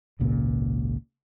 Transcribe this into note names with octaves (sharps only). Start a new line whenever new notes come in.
G#1 C#2 A#2 C#3